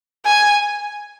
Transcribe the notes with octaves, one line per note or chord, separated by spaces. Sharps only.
G#5